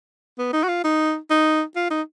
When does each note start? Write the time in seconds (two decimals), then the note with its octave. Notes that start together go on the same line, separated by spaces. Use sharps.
0.38 B3
0.53 D#4
0.64 F#4
0.69 F4
0.84 D#4
1.30 D#4
1.76 F4
1.91 D#4